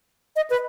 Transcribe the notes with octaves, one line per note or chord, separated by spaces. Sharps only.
D#5
B4